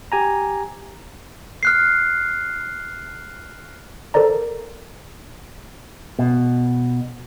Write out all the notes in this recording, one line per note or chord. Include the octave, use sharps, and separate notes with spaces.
G4 G#5 A#5
F6 F#6 C7
A4 A#4 C5 D5 A#5
B2